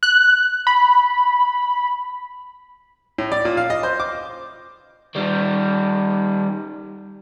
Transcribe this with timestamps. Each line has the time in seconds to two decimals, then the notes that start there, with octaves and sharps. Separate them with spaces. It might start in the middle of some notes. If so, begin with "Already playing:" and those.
0.03 F#6
0.67 B5
3.18 A2
3.32 D5
3.45 A#2
3.57 F5
3.70 D#5
3.83 C5
4.00 D6
5.15 D#3 G3